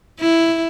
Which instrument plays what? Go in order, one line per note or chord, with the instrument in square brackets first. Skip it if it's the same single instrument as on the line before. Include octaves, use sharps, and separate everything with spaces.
[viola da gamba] E4